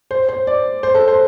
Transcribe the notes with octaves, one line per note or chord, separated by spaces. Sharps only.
C5
C5
D5
C5
A4
C5